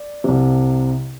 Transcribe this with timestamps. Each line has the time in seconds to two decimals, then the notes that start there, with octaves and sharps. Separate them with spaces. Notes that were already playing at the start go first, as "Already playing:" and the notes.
Already playing: D5
0.24 C2 C3